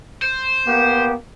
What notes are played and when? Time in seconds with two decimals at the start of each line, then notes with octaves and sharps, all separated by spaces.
0.22 C5
0.67 A#3 B3 G4